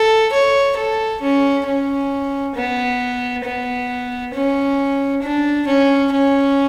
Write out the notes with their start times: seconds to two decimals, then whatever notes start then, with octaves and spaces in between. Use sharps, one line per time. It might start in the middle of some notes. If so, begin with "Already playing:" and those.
Already playing: A4
0.33 C#5
0.77 A4
1.22 C#4
1.66 C#4
2.56 B3
3.44 B3
4.34 C#4
5.23 D4
5.67 C#4
6.12 C#4